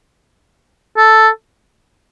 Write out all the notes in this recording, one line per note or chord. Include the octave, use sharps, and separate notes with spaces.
A4